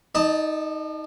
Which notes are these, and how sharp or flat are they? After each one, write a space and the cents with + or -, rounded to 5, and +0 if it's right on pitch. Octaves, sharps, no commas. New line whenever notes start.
D#4 +15 D#5 -45 A5 +0